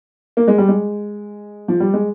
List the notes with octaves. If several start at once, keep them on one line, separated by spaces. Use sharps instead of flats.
A#3
G#3
G3
G#3
F3
G3
G#3